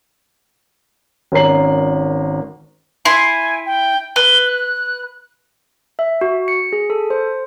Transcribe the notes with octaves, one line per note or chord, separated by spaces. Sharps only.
G#1 C#4 A#4 A#5 C7 F#7
E4 G#5 C6
G5
B4 G7
F#6
E5
F#4
C#7
G#4
A4
C5